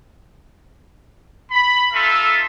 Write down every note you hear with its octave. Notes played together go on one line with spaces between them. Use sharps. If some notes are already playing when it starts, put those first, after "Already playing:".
B5
D#4 F4 A4 E5